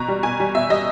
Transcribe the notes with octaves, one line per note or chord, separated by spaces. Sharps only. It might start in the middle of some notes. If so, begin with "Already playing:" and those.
Already playing: B2 A#5
G3
B2 G#5
G3
B2 E5
G3 D#5